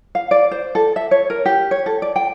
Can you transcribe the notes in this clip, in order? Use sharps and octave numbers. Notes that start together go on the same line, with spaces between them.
F5
D5
C5
A4
E5
C#5
A#4
G4
C#5
A4
D5
G5